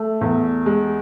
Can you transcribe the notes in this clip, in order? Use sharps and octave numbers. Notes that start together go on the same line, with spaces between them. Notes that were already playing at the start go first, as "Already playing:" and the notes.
Already playing: A3
E2
G#3